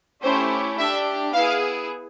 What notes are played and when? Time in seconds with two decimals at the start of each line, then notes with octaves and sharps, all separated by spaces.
0.23 A3 C#4 E4 G4 C5
0.78 D4 G4 E5
1.33 B3 E4 G#4 F5